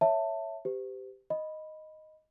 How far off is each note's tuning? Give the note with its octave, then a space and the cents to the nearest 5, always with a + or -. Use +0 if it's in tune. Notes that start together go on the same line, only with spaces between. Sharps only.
C#5 +0 E5 +0 A5 +20
G4 -5 C5 -45
D#5 +0 B5 +0